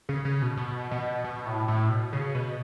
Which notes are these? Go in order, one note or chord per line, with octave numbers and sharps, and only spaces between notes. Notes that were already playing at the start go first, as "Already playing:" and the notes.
C#3
C#3
B2
B2
B2
B2
A2
A2
B2
C#3
B2